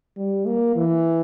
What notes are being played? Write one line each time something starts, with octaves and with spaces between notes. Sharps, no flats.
G3
A#3
E3